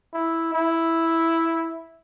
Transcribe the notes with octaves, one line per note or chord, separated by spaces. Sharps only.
E4
E4